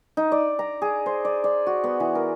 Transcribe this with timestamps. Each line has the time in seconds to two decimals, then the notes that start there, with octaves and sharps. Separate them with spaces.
0.17 D#4
0.32 D5
0.59 A#5
0.82 G#4
1.06 C5
1.25 D5
1.44 D5
1.67 F#4
1.84 B3
2.00 E3
2.15 A#4